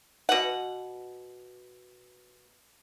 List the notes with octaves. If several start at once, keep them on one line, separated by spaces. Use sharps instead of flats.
B2 F#5